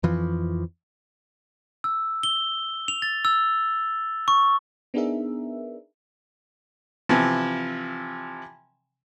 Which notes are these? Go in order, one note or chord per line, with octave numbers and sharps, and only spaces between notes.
F2 E3 F3
E6
G7
F7
A6
E6
C#6
B3 D4 D#4 G#4 A#4 E5
C3 E3 F3